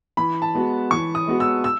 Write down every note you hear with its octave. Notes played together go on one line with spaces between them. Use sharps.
E3 B5
A5
G#3 B3 F#4
E3 C#6
D#6
G#3 B3 F#4
E6
E6